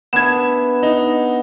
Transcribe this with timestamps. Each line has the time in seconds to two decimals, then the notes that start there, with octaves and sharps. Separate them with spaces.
0.13 B3 D4 E5 G#6 E7
0.83 D#4